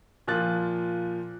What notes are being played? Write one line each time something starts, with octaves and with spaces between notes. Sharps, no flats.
A#2 F3 F#6 A6